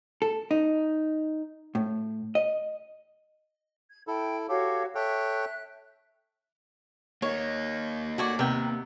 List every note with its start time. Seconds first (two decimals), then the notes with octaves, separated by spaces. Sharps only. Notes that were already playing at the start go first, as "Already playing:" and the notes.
0.22 A4
0.51 D#4
1.75 A2
2.35 D#5
3.91 G#6
4.07 E4 A4 G5
4.49 F#4 G4 A4 C#5 F5
4.95 A4 C#5 E5 G5 F#6
7.22 A#3 D#4 C#5
8.18 F#4 A4 C#5 D5
8.39 C3 B3 A#4 G5